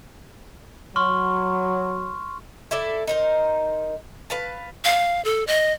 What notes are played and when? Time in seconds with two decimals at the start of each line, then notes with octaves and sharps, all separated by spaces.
0.96 F#3 C6 C#6 F6
2.71 E4 A4 D5
3.07 D#4 A#4 C5
4.30 B4 F5 A5
4.85 F5
5.25 A4
5.47 D#5